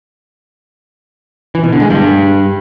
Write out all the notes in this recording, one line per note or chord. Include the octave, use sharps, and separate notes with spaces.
E3
B2
D3
G#3
G2